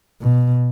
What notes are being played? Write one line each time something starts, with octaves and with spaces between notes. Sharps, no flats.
B2